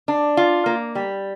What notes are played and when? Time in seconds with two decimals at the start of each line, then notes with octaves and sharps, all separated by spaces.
0.08 D4
0.37 F4
0.66 A#3
0.95 G3